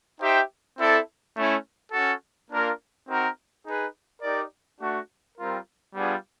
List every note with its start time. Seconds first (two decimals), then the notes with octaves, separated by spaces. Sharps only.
0.20 D#4 G4 C5 E5 G5
0.79 C4 E4 A4 D5
1.36 A3 C#4 E4
1.93 C#4 F#4 A4
2.51 A#3 D4 F4 A#4
3.09 C4 D#4 F#4 A#4
3.66 D#4 G#4 B4
4.22 D#4 G4 A#4 D5
4.80 A3 D4 F#4
5.38 G3 C4 F4 A#4
5.95 G3 B3 D4 F4 G#4